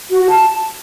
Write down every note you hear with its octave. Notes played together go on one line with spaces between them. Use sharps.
F#4
F#4
A5